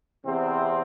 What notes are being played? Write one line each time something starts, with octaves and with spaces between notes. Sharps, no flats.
E2 C3 C4